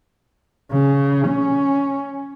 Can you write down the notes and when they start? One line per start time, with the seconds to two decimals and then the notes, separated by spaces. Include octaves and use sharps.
0.72 C#3
1.29 C#4